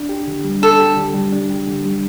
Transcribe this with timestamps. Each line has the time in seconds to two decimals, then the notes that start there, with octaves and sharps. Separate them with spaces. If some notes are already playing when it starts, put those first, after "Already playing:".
Already playing: D4
0.09 G4
0.27 D3
0.44 G3
0.62 D4 A4
0.80 G4
0.97 D3
1.14 G3
1.32 D4
1.50 G4
1.67 D3
1.86 G3